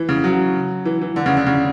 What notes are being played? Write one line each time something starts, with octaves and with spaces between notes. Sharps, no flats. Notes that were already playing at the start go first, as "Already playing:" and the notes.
Already playing: E3
C#3
F#3
E3
E3
D3
C#3
D3
C#3